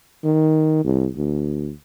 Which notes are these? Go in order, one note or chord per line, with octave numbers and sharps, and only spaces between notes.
D#3
C2
D2